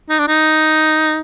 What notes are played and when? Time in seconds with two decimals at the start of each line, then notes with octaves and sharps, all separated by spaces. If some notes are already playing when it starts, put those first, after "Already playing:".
0.10 D#4
0.19 D4
0.28 D#4